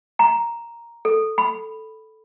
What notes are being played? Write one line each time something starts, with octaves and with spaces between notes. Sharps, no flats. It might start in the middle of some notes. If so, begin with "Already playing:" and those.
A#5
A4
B5